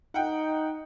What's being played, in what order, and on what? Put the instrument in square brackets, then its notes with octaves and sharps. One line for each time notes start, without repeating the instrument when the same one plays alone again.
[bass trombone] D#4 [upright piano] F#5 G5